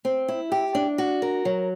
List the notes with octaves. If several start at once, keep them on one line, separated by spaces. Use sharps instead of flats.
C4
E4
G4
D4
F#4
A#4
F#3